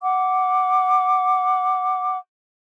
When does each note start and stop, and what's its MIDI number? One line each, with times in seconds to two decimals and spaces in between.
0.03 2.17 78
0.03 2.17 86